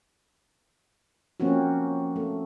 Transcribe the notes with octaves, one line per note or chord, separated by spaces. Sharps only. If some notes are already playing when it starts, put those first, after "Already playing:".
F3 A#3 C4 C#4 F#4
A3